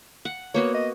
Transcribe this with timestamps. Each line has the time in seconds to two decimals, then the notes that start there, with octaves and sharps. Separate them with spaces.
0.25 F#5
0.54 A#3 B3 F#4 C#5
0.75 D#5